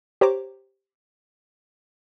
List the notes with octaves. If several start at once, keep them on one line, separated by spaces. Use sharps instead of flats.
G4 C5 C#5 A#5 D6